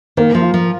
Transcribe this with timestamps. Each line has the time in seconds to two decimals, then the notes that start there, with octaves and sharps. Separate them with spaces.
0.17 D#3 A#3
0.35 F3
0.42 F4
0.54 F3